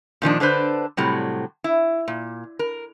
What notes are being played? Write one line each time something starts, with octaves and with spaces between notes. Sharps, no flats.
A#2 D#3 F3 D4
D3 D4 B4 C5
A2 C3 F#3 G3
E4
A#2
A#4